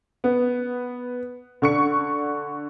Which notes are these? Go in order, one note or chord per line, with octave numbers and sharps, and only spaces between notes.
B3
D3 C#6 C#7